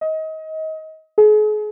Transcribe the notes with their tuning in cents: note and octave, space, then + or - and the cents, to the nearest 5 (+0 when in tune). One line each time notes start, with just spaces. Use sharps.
D#5 +25
G#4 +40